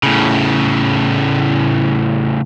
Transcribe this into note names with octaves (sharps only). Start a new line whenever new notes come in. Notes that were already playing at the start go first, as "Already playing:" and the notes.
A2 C#3